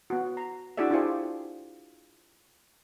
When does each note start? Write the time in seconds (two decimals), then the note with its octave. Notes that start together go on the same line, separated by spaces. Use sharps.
0.10 B3 F#4
0.37 A#5
0.77 D4 E4 F#4 G#4 D5 E5
0.90 D4 E4 F4 G4 G#4 C5